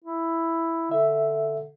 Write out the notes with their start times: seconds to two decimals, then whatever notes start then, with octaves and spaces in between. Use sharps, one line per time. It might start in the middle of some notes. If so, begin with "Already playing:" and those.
0.04 E4
0.91 D3 E5